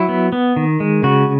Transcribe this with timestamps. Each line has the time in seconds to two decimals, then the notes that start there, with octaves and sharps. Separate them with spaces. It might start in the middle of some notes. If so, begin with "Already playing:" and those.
Already playing: F#3 E4
0.09 B3
0.32 B3
0.56 D#3
0.80 G#3
1.03 C#3 F#4